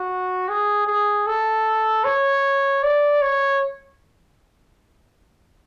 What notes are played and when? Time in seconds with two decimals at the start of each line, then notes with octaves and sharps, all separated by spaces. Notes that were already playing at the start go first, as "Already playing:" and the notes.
Already playing: F#4
0.49 G#4
0.87 G#4
1.27 A4
2.04 C#5
2.83 D5
3.22 C#5